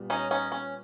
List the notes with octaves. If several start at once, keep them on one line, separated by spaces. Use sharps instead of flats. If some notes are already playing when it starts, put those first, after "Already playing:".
Already playing: A#2 G3 B3
C#4 D#4
C#4 D#4
C#4